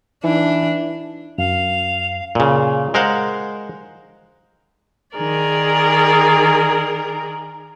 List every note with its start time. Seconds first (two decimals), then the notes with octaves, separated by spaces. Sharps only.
0.24 E3 D4 D#4
1.38 F#2 F5 F7
2.35 A#2 C#3
2.94 G#3 A#4 C5 F5 F#5
5.15 D#3 G#4 A#4 D5